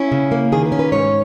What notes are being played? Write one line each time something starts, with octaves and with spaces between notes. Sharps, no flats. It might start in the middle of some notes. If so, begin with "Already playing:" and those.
Already playing: C#4 E4
C#3
A#3
D#3 G#4
B4
C#4
B4
G#2 C#5